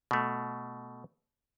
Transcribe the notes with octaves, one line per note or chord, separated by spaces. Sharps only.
B2 A3